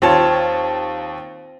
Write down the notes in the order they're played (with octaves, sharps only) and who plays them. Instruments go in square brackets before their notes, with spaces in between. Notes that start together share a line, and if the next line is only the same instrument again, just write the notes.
[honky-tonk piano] D#2 A5 [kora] C4 F4 C#5